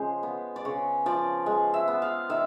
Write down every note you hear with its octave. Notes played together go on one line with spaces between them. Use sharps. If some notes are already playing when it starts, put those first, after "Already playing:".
Already playing: C#3 F3 G#3 C5
B3
D5
C#3 C#5
F3 D5
G#3
E5
B3
F5
D#3 E5